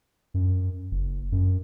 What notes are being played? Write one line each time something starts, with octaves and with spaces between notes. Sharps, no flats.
F#2
F#1
F#2